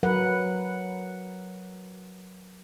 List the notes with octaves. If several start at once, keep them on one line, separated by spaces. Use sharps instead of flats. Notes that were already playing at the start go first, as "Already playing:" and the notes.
F#3 A#4 B4 F#5